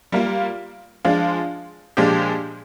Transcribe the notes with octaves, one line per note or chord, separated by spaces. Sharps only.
G3 A#3 F4
F3 G#3 D4 F4
A#2 F3 G#3 D4 G4